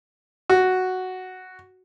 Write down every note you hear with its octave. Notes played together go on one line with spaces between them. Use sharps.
F#4